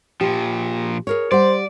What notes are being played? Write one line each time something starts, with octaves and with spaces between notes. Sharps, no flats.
A#2 F3 G4
G#4 A#4 C#5
G3 C5 D5 F#5